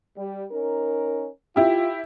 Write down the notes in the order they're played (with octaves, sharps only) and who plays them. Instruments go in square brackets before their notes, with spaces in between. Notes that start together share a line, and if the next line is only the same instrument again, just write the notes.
[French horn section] G3
C#4 D#4 A#4
[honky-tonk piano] E4 G4 [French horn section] F4